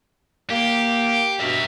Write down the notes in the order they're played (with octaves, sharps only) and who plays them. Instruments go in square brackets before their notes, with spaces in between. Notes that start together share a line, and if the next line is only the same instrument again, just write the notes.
[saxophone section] A#3 [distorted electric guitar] G4
[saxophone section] G2 B2 [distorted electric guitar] A#4 E5